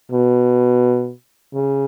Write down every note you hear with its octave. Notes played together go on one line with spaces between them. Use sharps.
B2
C#3